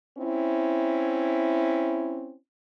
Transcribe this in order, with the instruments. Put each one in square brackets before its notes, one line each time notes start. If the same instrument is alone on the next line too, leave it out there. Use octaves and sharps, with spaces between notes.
[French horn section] C4 C#4 E4